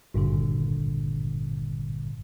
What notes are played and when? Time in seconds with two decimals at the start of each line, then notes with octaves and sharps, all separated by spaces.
0.14 G#1 G2 A#2 D3